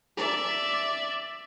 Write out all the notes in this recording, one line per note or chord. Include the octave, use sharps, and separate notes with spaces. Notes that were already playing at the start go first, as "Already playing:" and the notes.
D5 E5